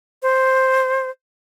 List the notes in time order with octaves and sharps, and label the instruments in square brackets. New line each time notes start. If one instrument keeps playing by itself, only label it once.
[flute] C5